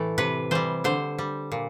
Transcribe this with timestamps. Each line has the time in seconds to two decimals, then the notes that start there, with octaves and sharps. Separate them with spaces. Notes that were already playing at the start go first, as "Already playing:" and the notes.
Already playing: A2 E3 A3
0.18 C3 B4
0.51 E3 G3 C5
0.84 D3 C5
1.18 G3
1.52 A#2